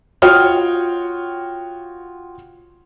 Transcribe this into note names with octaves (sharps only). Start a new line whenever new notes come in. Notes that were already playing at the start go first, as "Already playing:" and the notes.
F4 F#4 C#5 G5 D#6 F6